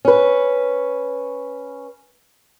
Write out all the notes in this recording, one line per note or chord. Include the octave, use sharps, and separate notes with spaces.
C#4 B4